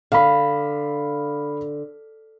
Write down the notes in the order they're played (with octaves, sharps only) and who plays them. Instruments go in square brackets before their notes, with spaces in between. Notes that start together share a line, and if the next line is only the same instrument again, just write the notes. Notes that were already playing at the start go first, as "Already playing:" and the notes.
[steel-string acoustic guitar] D3 [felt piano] F5 B5